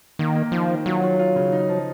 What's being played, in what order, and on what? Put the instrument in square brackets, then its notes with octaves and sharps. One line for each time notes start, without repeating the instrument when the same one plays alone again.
[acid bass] D#3 [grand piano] A#3
[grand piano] A#3
[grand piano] D#3 [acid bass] F3
[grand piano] D#3
[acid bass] F#3 [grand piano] F4
[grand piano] F4
F4
C#3
D#4
F3